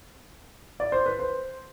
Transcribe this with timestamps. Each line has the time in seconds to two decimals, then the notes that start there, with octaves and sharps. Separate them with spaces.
0.80 D5
0.92 C5
1.06 B4
1.19 C5